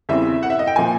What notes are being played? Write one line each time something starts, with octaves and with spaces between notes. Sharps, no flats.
E2 C#3 E3 G3 C4 E5
F#5
E5
D#5
G5
A#2 F3 G#5